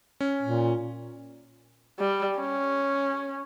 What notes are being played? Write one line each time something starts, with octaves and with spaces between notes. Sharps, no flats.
C#4
A#2
G3
C#4